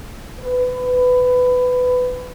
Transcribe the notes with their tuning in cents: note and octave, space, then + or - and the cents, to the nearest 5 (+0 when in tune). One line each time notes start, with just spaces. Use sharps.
B4 +20